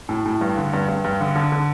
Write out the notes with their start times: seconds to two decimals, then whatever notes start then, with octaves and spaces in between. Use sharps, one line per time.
0.09 A2
0.26 A2
0.41 G2
0.57 D3
0.73 G2
0.88 G2
1.04 G2
1.21 D3
1.36 D3
1.52 D3